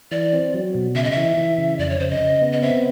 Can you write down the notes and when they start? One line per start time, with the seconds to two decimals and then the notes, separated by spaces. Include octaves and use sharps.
0.11 E3 D5
0.33 C4
0.54 F#3
0.75 B2
0.95 C#3 E5
1.04 D#5
1.11 E3 E5
1.37 E3
1.58 C#3
1.79 F2 D5
1.90 C#5
2.00 C#3 C5
2.10 D#5
2.21 C#3
2.42 B3
2.52 D#5
2.62 C4 E5